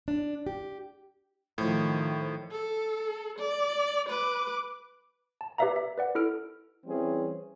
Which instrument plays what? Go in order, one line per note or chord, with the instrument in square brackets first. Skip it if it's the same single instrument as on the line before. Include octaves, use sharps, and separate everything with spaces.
[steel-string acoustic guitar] D4
G4
[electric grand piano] A2 [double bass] D#3 F3
[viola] A4
D5
B4 D6
[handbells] A5
G4 B4 D5 E5 F5 A#5
E5
B4 D5 F#5
E4 A4 F6 D7
[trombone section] E3 G3 C4 C#4 G#4